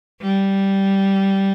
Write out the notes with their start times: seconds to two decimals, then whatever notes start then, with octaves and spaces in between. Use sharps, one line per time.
0.21 G3